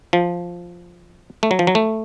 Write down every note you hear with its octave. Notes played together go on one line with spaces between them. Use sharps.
F3
A3
F#3
F3
F#3
A3